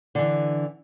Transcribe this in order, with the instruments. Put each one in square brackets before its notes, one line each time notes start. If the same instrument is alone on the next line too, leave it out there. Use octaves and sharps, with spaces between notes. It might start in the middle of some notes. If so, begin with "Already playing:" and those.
[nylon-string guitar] D3 E3